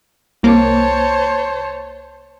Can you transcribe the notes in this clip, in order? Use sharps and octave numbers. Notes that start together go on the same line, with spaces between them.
C2 A#3 C5 C#5 A5 D6